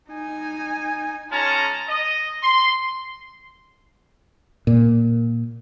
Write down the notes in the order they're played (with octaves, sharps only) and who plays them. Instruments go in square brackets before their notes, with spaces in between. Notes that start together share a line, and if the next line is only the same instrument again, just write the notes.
[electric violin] D#4 G#5
[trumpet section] G#3 C#4 F4 A5 A#5
D#5
C6
[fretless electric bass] A#2